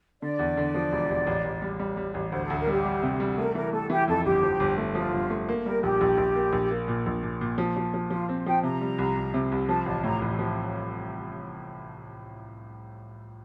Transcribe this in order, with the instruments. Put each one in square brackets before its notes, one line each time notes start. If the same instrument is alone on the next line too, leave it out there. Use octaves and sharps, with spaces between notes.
[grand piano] D3 [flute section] D5
[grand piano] E2
D3
F3
E1
E1
A1
A1
G3
G3
G3
A1
[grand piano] D2 [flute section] C5
[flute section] A4
[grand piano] D2
[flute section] A#4
[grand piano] G3 [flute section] G4
[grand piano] G3
C3
G3
[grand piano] A3 [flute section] A#4
[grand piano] E3 [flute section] A#4
[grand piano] A3 [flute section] A4
[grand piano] E3 [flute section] G4
[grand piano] F2 [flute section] A4
[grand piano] G1 [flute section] G4
[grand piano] F3
G1
A3
[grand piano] F3 [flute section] F4
[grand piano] G1
A3
A#3
[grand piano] G3 [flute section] A#4
[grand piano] A#1 [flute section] G4
[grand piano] A#1
A#1
A#3
A#1
A#3
A#2
A#1
A#2
A#2
F3
F3
F3
[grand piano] F3 [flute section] F4
[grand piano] C4
[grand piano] F3 [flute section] G5
[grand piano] C3 [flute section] A#5
[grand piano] G3
C2
C2
C3
C2
[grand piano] F3 [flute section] A5
[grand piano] A1 [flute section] A5
[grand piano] A2 [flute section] A#5
[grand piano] A1
F3